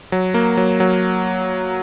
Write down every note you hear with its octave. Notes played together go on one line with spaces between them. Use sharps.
F#3
A#3
F#3
F#3